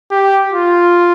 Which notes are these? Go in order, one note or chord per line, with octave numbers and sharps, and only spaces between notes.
G4
F4